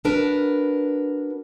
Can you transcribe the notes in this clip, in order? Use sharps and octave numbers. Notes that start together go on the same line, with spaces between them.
D4 F#4 A#4 B4